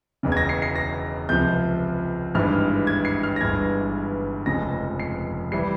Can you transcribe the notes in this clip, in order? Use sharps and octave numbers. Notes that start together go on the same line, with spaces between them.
E1 E2 C#3
G#6
A#6
C7
C7
A#6
C#2 C3 F3 G6
G#1 G2 E3 G#3 F6
G#6
C7
F6
A#6
G1 G2 E3 G#3 G#6
F1 F2 C#3 F3 G#3 A#6
C7
E3 G3 C7